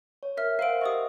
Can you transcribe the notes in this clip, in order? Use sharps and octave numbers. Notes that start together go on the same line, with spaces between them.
C#5
A#4 E5 F6
A#4 C5 F5 F#5 D7
G4 D#5 E5 C#6 D#6